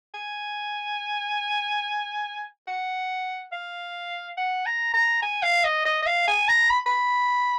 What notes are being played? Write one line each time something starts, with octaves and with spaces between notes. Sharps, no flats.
G#5
F#5
F5
F#5
A#5
A#5
G#5
F5
D#5
D#5
D#5
F5
G#5
A#5
B5
B5